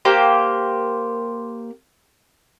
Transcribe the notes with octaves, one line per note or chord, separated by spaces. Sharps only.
A#3 G4 C5